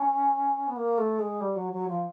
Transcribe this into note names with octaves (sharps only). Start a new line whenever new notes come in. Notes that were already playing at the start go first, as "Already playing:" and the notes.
Already playing: C#4
B3
A#3
A3
G#3
G3
F#3
F#3
F3